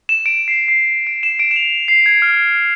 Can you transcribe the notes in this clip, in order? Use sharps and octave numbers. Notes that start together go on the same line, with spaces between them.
E7
D7
C7
C7
D7
E7
D7
E7
F7
C7
G#6
F6